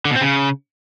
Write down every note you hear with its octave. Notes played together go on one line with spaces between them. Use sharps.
D3
B2
C4
C#3